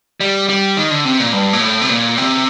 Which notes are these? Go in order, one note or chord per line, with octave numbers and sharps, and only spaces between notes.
G3
G3
D#3
D3
C3
A#2
G2
A#2
A2
C3
A#2
C3